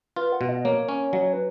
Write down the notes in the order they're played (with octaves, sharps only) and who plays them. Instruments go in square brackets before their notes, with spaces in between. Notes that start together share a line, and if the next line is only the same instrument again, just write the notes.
[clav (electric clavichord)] F4 [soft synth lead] B4
[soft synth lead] F#5
[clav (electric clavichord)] B2
[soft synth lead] D#5
[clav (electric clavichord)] A#3 [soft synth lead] C#5
[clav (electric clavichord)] C#4
[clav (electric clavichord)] F#3 [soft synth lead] D#5
[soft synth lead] C#5
B4